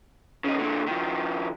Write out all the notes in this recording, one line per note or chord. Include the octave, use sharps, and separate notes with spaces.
C#3 D#4
A#2 D3
D#3 F3